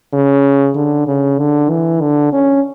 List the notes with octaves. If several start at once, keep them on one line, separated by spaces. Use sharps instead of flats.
C#3
D3
C#3
D3
E3
D3
C#4